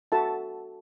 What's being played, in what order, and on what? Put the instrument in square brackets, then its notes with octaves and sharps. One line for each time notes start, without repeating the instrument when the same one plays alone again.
[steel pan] F#4 A4 E5 A5